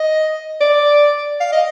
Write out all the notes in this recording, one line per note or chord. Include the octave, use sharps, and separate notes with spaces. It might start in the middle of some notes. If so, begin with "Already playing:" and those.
Already playing: D#5
D5
F5
D#5